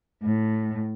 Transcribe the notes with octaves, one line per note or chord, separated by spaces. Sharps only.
A2